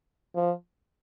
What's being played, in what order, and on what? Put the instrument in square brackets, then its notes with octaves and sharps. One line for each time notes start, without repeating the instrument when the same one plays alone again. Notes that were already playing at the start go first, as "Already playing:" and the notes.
[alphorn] F3